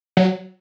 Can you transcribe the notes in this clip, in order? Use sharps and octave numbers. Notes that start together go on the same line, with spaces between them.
F#3